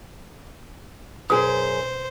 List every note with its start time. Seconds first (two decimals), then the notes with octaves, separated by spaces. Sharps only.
1.30 F#2 B2 G#4 C5